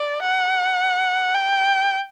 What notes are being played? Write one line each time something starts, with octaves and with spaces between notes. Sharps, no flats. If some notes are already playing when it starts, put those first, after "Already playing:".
Already playing: D5
F#5
G5